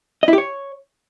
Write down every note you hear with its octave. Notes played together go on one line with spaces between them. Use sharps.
D#5
E4
G4
C#5